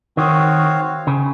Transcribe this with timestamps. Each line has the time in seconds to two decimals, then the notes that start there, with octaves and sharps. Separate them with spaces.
0.17 D#3 C4 F#4 C#5 F5
1.07 C#3